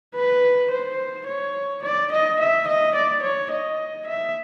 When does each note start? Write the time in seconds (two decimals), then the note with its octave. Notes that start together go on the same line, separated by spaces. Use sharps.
0.16 B4
0.71 C5
1.27 C#5
1.83 D5
2.12 D#5
2.40 E5
2.68 D#5
2.95 D5
3.23 C#5
3.51 D#5
4.07 E5